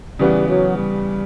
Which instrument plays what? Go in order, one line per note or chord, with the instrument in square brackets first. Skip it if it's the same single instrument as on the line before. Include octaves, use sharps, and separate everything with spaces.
[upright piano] C#3 E3 B3 [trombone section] G3
[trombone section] F#3
G3